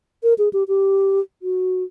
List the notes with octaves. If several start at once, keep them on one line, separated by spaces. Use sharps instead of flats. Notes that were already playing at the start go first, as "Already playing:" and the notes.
A#4
G#4
G4
G4
F#4